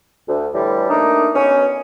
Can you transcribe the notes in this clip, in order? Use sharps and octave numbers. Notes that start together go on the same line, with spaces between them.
D2
A2 D3 E3 G3
A3 A#3 D4 D#4 A#4
B2 C#4